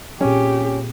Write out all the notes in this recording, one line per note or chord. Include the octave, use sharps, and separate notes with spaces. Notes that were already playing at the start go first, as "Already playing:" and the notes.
A#2 C4 C#4 G4 G#4